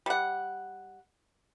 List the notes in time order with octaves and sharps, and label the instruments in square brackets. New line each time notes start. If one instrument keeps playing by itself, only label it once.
[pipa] G3 F#5